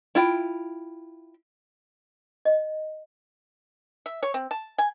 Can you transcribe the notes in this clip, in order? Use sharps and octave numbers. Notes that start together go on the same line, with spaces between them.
E4 F4 G5
D#5
E5
C#5
C4
A5
G#5